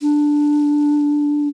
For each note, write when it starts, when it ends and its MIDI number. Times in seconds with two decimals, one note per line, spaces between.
0.01 1.48 62